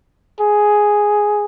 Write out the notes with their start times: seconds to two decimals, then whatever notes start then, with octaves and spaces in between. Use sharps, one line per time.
0.40 G#4